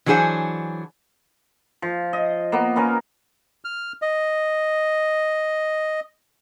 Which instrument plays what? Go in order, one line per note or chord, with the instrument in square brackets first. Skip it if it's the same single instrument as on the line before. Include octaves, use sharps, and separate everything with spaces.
[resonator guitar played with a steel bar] E3 F#3 D4 G#4 C5 F#5
[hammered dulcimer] F3
D#5
A#3 B3
A#3 B3 C#4 A#4
[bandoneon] F6
D#5